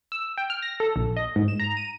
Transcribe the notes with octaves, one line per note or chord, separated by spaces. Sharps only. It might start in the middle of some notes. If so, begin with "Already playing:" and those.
E6
G5
F6
A#6
A4
A#1
D#5
G#2
E7
A#5
D#7